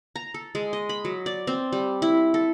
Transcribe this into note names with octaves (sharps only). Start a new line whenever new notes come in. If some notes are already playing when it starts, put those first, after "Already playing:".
A#5
A4
G#3
D#5
B5
F#3
D5
C4
G3
E4
A4